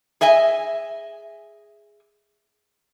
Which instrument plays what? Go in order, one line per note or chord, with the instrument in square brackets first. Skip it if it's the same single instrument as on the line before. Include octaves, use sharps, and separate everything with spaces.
[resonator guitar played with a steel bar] G#4 D#5 E5 G#5